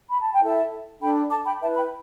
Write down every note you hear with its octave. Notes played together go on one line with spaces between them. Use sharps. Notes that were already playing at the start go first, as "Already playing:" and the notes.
B5
A5
G5
E4 A4 E5 A5
D4 A4 G5 B5
A5 D6
G5 B5
E4 B4 E5 A5
G5 B5